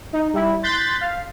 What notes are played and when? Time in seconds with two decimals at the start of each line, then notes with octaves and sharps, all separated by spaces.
0.13 D#4
0.33 G3 E4
0.63 C6 F#6 G6 A6 B6
1.00 F5